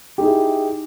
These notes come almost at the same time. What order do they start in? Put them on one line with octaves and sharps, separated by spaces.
G4 D#4 G#4 E4